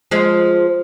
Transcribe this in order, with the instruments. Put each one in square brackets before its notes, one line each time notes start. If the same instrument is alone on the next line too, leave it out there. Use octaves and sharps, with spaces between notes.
[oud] F3 G#3